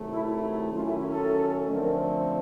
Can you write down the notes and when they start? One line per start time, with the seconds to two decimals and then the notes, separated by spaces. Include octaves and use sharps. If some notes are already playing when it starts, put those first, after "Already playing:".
Already playing: C3 D#3 F#3 A3
0.09 E4
0.25 E4
0.73 D#3 F#3 A3 C#4 F4
0.86 E4
0.97 E4
1.10 A4
1.70 D3 F3 A3 C4 A#4
1.82 A#4